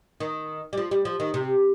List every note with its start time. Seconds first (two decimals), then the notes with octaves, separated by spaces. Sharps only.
0.20 D#3
0.73 G3
0.77 F3
0.91 G3
1.05 F3
1.20 D#3
1.34 C3